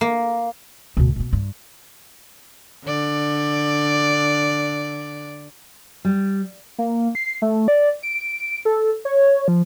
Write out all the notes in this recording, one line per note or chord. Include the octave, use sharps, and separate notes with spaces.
A#3
D2 B2
B2 B3
G2
D3 D5
G3
A#3
C7
A3
D5
D7
A4
C#5
F3